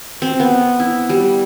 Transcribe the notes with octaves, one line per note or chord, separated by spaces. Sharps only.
C4
B3
E4
G3